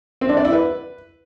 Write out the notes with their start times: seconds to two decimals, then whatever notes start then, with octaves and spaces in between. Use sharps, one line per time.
0.21 C4
0.29 D4
0.37 D5
0.45 E4
0.52 B4